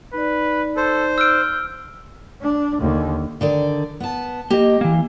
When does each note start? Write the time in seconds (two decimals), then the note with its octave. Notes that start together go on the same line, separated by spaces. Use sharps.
0.14 D#4 B4 D5
0.77 A4 C5
1.18 E6 F6 G6 D7
2.41 D4
2.80 D#2 D3
3.41 D3 D#3 D5
4.00 B3 A5
4.51 A#3 G4 D#5
4.81 E3 A#3